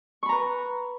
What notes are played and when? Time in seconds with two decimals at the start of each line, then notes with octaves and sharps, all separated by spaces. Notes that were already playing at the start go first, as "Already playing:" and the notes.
0.23 C#6
0.26 B5
0.29 A#5
0.32 B4